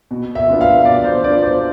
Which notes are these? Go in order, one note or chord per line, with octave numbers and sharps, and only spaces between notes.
B2
E5
B3 D4 F4
F5
B2 D5
C5
B3 D4 F4 D5
C5